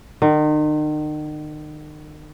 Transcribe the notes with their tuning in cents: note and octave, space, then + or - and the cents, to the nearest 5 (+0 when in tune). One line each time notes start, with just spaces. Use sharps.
D#3 -40